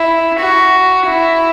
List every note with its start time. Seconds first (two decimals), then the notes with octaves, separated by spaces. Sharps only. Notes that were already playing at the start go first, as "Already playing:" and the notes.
Already playing: E4
0.39 F#4
1.07 E4